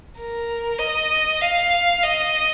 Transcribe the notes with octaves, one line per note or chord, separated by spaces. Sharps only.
A#4
D#5
F5
D#5